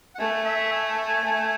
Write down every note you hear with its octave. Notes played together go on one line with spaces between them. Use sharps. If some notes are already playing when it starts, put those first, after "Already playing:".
F#5
A3 G#5
E5
G#5
A3